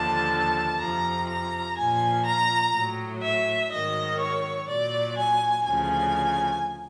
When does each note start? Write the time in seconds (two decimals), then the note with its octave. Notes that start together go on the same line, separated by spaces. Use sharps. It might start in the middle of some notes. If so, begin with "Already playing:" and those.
Already playing: D#2 D3 F3 A5
0.80 F2 C3 F3 A#5
1.29 A#5
1.78 A#2 F3 G#5
2.26 A#5
2.75 A2 F#3
3.23 E5
3.72 G#2 D#3 F#3 D#5
4.20 C#5
4.69 A#2 F#3 D5
5.18 G#5
5.66 D2 C#3 F3 G#5